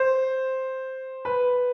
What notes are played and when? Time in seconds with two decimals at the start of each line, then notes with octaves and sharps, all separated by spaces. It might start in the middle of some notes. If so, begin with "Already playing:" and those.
Already playing: C5
1.25 B4